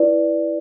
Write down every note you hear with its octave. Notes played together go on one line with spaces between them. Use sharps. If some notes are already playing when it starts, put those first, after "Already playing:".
Already playing: E4 B4 D5